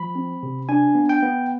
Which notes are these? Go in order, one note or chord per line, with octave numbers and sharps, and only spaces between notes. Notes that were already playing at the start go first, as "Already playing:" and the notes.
Already playing: F3 B5
C4
C3
D4 G#5
B3
G5
B3